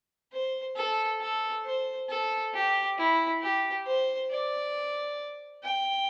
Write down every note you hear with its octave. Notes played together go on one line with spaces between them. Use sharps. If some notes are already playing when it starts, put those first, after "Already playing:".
C5
A4
A4
C5
A4
G4
E4
G4
C5
D5
G5